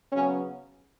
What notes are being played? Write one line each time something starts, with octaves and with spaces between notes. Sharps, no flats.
C#3 F#3 B3 C#4